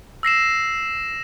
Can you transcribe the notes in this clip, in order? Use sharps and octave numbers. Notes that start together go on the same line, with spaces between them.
E6 A#6 C7 E7